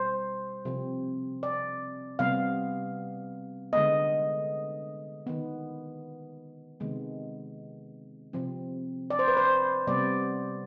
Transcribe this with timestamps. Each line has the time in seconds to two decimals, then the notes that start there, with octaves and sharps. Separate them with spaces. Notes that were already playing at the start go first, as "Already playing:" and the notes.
Already playing: B2 G3 C5
0.65 C3 F3 C4
1.43 D5
2.19 C3 G3 B3 F5
3.73 D3 G#3 B3 D#5
5.27 D#3 B3
6.80 C3 D#3 G#3 B3
8.33 C3 F3 C4
9.10 D5
9.19 C5
9.28 B4
9.37 C5
9.87 C3 G3 B3 D5